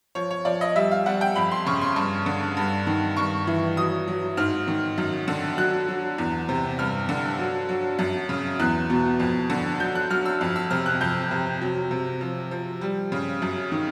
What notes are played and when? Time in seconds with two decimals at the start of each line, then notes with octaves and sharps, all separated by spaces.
0.15 F3 C#5
0.30 C#5
0.45 F3 D5
0.61 D#5
0.76 G3 E5
0.91 F5
1.06 G3 F#5
1.21 G5
1.35 F2 B5
1.51 C6
1.66 C#3 C#6
1.81 C6
1.96 G2 C#6
2.26 D3
2.57 G2
2.87 D#3
3.17 G2 C#6
3.47 E3
3.77 F#3 D#6
4.08 F#3
4.37 G#2 F6
4.68 D#3
4.98 F#2
5.28 D3
5.58 F#3 F#6
5.89 F#3
6.18 E2
6.49 C3
6.79 G2 F6
7.09 D3
7.39 F#3
7.69 F#3
7.99 F#2
8.29 C#3
8.60 E2 F#6
8.90 B2
9.20 F2
9.50 D3
9.80 F#3 G6
9.95 F#6
10.10 F#3 F6
10.25 E6
10.41 F2
10.56 E6
10.70 C3 F6
10.86 F#6
11.01 F2 G6
11.31 C3
11.61 F#3
11.91 C3
12.21 F3
12.51 F3
12.81 G3
13.12 C#3
13.42 F#2
13.72 D#3